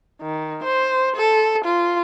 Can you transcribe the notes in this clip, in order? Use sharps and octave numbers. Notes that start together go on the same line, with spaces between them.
D#3
C5
A4
F4